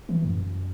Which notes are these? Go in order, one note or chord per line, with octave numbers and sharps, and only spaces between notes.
E3
F#2